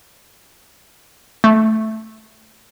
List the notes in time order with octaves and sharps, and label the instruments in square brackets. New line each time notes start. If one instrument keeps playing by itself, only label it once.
[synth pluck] A3